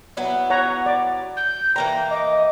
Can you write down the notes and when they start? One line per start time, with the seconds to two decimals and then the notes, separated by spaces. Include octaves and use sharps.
0.17 F#3 B3 E4
0.50 C#5 F#5 A#5
0.86 D5
1.37 G6
1.76 E3 A#3 G5 A#5
2.11 D#5 D6